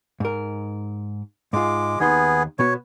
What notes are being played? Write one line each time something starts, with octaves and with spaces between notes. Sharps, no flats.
G#2 A#4
G#2 G#3 F4 D6
D#2 B3 D#4 G#4 C6
B2 B3 F#4 C#5